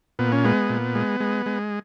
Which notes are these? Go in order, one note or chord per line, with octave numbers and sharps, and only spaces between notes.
A#2 B3
C#4
G#3 B3
A#2
G#3
G#3
G#3